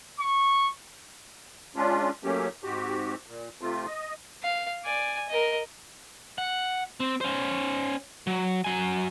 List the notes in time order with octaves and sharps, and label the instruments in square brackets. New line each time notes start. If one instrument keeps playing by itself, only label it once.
[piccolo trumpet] C#6
[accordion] G#3 C#4 D4 F4
F#3 A3 A#3 C#4 G4
G#2 C4 F#4 G4
A#2
C3 A3 C4 F4
D#5
[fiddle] F5
D5 G#5
A#4 D#5
[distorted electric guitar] F#5
C4
C#4 C5
F#3
F#3 G#5